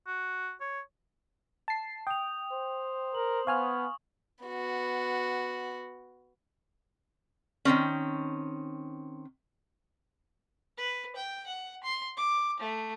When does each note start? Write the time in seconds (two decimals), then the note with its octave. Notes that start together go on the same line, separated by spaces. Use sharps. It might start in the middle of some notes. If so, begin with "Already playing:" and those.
0.07 F#4
0.60 C#5
1.68 A5 C7
2.07 G5 D#6 F7
2.52 C5
3.15 A#4 F#7
3.47 B3 F5 G#5 C#6 F6
4.45 B3 F#4
7.65 D#3 F#3 C4 C#4
10.78 B4
11.16 G5
11.47 F#5
11.83 C6
12.17 D6
12.60 A3